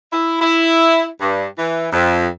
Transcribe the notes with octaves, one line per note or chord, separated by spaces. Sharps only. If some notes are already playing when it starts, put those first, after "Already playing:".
E4
E4
G2
E3
F2